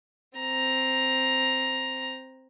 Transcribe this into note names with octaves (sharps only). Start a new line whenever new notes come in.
C4 A#5